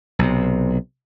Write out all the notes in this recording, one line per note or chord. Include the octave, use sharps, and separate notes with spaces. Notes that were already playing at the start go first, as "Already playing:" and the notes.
B1 C3